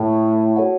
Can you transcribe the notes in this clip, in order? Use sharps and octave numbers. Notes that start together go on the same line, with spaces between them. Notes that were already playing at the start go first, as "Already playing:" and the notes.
Already playing: A2
F#4 A4 C#5 F#5